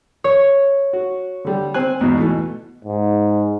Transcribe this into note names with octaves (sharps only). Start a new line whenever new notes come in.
C#5
F#4
D3 G3
C4 C5 G#5 F#6
E2 G#2 B2
B2 E3 A3
G#2